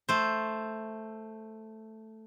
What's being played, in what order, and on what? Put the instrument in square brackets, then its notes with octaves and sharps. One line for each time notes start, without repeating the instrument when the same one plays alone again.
[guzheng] A3 C5